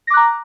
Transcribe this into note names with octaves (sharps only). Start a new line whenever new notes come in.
A#5 D6 F#6 A#6